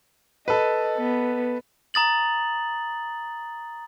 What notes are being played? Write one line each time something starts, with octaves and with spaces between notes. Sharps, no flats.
A4 B4 D#5
B3
A#5 D#6 A6 F#7